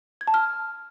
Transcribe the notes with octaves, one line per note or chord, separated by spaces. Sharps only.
G#6
A5
F6